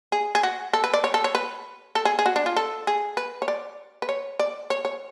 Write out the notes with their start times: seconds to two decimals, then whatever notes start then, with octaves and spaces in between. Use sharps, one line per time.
0.12 G#4
0.35 G#4
0.43 F#4
0.73 A4
0.84 B4
0.94 D5
1.04 C#5
1.14 A4
1.24 C#5
1.35 B4
1.95 A4
2.05 G#4
2.19 G#4
2.26 F#4
2.36 D4
2.46 F4
2.56 A4
2.87 G#4
3.17 B4
3.42 C#5
3.48 D5
4.02 B4
4.09 C#5
4.39 D5
4.70 C#5
4.85 C#5